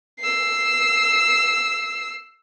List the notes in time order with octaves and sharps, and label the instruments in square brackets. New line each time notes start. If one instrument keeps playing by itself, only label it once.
[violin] E6 C7